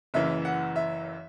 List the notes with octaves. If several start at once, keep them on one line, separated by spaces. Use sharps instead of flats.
F#1 F#2 E3 E5
F#5
E5